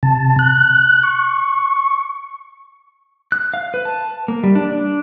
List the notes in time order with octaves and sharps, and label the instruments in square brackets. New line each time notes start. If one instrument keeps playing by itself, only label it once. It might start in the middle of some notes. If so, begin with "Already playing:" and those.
[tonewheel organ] C3 A5
F#6
C#6
[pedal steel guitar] F#6
F5
B4
A5
A#3
G3
D4
D4